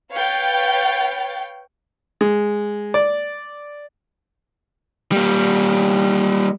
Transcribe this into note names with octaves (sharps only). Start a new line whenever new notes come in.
B4 C#5 F5 G5 A6
G#3
D5
G3 A#3